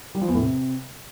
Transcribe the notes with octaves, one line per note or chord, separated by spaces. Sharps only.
G3
F3
E2
A2
C3